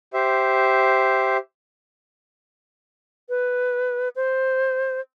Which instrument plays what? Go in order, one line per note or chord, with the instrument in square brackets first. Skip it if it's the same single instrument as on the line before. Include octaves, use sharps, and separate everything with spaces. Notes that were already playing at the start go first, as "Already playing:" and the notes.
[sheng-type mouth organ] G4 C5 E5
[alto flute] B4
C5